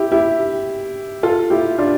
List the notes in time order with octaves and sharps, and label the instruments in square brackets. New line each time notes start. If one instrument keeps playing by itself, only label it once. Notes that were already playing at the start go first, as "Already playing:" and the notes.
Already playing: [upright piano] E4 G4
E4 G4
F4 A4
E4 G4
D4 F4